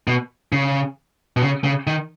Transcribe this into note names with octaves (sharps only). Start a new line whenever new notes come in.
B2
C#3
B2
C#3
C#3
D#3